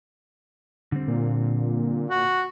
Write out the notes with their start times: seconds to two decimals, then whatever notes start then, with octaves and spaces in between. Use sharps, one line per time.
0.92 D3 G3 C4
1.08 A#2
2.10 F#4